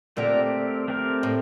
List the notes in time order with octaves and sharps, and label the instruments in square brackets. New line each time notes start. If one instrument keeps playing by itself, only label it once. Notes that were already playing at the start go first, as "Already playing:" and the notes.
[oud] A#2 D3 [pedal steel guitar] A3 C4 G4 A#4
[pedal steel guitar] A3 C4 G4 A#4
[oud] A2